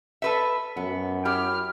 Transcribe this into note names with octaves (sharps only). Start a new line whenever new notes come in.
A4 B4 E5
F#2 B3
E4 G4 G#4 F6